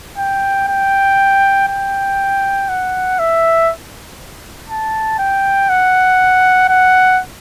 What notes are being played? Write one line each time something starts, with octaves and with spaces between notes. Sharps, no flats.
G5
G5
G5
F#5
E5
A5
G5
F#5
F#5